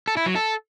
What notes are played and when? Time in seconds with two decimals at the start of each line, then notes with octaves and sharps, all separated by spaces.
0.08 A4
0.17 E4
0.26 F#3
0.35 A4